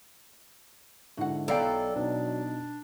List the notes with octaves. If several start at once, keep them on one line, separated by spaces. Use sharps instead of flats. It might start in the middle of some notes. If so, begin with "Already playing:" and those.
G#2 D3 E4 F#4 F#5
B1 F#3 E4 A4 D5 F5 G5
B2 D4 D#4